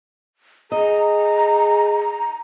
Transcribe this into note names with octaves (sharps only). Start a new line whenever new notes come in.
G#4 D#5 A#5